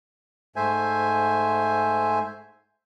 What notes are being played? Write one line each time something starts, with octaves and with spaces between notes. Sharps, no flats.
G#2 A3 C5 E5 G#5